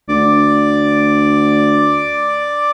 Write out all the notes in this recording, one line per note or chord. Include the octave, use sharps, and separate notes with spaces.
D2 D5 D6